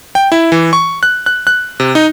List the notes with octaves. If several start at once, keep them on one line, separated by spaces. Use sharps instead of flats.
G5
E4
E3
C#6
F#6
F#6
F#6
C3
D#4